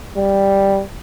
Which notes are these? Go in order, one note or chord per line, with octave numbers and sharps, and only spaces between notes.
G3